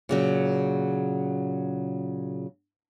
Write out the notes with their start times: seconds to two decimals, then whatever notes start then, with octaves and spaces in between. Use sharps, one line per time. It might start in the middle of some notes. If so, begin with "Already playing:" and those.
0.09 A#2 C#3 F#3